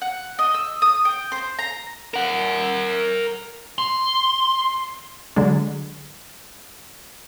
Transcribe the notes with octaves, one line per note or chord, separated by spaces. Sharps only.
F#5
D#5
E6
D#6
G5
C5
A#5
A#4 F#5
C6
D3 F#3 G#3 D4